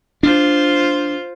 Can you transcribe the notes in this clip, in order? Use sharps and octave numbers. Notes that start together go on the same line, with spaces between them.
D4 F4 C5